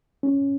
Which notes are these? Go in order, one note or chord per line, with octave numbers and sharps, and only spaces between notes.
C#4